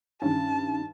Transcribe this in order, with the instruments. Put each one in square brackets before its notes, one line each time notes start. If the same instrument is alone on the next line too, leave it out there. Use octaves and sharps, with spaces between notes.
[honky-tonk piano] G2 D#3 [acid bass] C#4 [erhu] A5